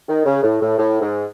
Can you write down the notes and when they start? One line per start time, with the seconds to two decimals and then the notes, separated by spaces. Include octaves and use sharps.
0.09 D#3
0.26 C#3
0.43 A2
0.62 A2
0.79 A2
1.01 G#2